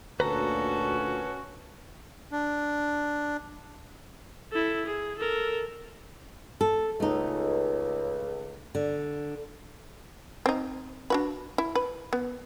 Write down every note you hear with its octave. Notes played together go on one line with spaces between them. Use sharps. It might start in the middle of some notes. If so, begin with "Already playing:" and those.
D2 A#2 C#4 F#4 A4 B4 A#5
D4
E4 A4
G#4
A4 A#4
A4
C#2 A3 D#4
D3
C4 D#4
D4 F#4 B4
E4
B4
B3